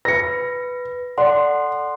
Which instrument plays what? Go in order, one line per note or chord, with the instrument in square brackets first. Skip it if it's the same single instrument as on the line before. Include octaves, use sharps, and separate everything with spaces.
[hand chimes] B4 [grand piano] A#6 C#7
[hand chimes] A4 F#5 C6 [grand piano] D5